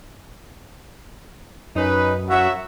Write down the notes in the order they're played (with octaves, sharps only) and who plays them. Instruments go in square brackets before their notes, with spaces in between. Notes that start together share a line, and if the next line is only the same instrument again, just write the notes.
[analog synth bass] F#2 [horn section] C#4 D#4 B4
[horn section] F#3 E5 [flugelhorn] F#4